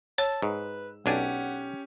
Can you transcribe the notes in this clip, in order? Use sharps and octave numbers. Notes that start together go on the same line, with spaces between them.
C#5 A5 E6
G#2 B4
B1 C#4 D4 G4 F#5 G#5